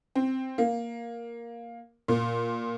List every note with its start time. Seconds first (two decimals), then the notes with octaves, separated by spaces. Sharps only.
0.15 C4
0.58 A#3
2.08 A#2